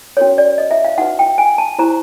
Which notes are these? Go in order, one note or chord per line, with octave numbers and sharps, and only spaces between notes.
C#4 F#4 A#4 C#5
D5
D#5
E5
F5
D#4 F#4 B4 F#5
G5
G#5
A5
E4 G4 C5 A#5